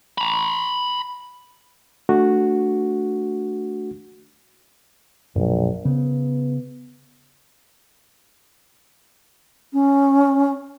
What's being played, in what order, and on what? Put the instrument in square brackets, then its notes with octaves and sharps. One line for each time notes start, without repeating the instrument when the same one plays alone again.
[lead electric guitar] A#5 B5
[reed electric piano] A3 D4 F#4
[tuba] A#1 [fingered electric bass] F#2 B2 F#3
[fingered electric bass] C#3 [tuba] B3
[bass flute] C#4